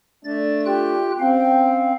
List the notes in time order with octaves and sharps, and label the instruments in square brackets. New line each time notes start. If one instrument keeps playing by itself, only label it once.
[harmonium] A3 D4 [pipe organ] A6
[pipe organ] F4 G5 F#6 [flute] G4
[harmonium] C4 [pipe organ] C#4 F5 [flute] G5